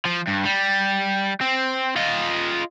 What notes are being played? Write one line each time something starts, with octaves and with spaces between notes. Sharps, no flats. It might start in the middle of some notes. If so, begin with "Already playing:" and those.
F3
G2
G3
C4
F4 D#5